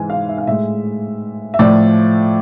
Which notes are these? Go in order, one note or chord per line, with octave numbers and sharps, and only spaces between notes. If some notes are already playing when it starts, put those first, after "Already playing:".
Already playing: G#2 E3 G#3 G#5
F5
E5
F5
A2 G#3 E5
E5
A2 F3 A3 D5